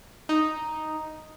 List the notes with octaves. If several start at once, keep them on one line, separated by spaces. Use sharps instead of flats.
D#4